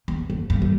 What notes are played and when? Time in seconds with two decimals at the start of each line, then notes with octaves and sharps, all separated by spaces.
0.08 E2
0.30 F2
0.50 G2
0.62 G3